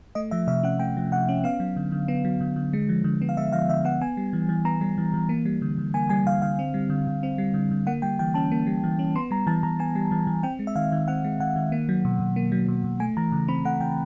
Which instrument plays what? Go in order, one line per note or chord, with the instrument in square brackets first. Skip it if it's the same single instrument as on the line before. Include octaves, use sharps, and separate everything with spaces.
[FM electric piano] A3 D#5
F3 E5
C3 E5
C#4 F#5
A3 G5
F3
C3 F#5
C#4
B3 F5
F#3
D3
D3
B3
F#3
D3
D3
G#3
F3
D3
B3
F5
G#3 E5
F3 F5
D3 E5
B3 F#5
B3 G#5
G3
E3
E3
B3 A#5
G3
E3
E3
A#3
G3
D3
D3
A#3 G#5
G3 G#5
D3 F5
D3 F5
C4
G3
D3
D3
C4
G3
D3
D3
A#3 F#5
G3 G5
E3 G5
C#4 A5
A#3
G3
E3
C#4
B3 C6
G3 A#5
E3 A5
E3 A#5
B3 G#5
G3
E3
E3
C4 G5
G#3
E5
D#3 F5
D#3
C4 F#5
G#3
D#3 F#5
D#3
A#3
F#3
B2
B2
A#3
F#3
B2
B2
A3 G#5
E3 A#5
C#3
C4 B5
A3 F#5
E3 G5